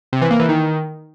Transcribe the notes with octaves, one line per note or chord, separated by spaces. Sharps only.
C3
E3
A#3
E3
D#3